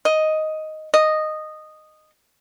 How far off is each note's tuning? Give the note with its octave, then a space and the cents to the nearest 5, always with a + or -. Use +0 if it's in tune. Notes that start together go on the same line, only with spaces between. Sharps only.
D#5 +5
D#5 -10